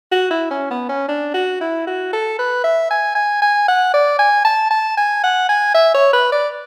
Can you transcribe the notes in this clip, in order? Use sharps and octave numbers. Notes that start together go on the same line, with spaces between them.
F#4
E4
C#4
B3
C#4
D4
F#4
E4
F#4
A4
B4
E5
G#5
G#5
G#5
F#5
D5
G#5
A5
A5
G#5
F#5
G#5
E5
C#5
B4
D5